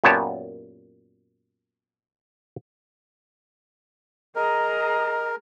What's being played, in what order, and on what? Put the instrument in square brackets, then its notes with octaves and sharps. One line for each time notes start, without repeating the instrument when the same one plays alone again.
[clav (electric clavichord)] F#2 A#2 B3 G4 C#5 A5
[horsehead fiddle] G#4 A#5 [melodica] A#4 [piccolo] D#5